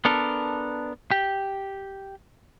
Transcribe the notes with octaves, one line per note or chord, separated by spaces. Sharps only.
B3 D4 A4 A#4
G4